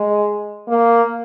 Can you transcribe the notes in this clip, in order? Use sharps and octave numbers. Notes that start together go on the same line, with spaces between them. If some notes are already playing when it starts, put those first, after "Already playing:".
Already playing: G#3
A#3